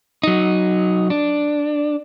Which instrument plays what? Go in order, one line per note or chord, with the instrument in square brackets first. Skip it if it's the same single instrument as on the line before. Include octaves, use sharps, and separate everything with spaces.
[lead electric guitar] F#3 D#4
D4